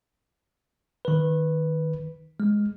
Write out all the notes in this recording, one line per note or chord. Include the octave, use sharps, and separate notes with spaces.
D#3 B4
G#3